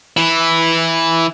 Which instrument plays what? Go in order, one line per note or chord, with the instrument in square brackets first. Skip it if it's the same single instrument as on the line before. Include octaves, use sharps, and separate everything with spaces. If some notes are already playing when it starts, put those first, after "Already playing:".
[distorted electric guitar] E3 E4